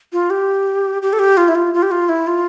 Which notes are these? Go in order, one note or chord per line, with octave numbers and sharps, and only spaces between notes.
F4
G4
G4
A4
G4
F4
E4
F4
F4
G4
F4
E4
F4